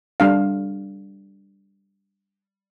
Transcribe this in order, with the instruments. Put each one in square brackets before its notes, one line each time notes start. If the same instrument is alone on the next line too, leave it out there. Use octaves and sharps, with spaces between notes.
[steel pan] G3 D4 F5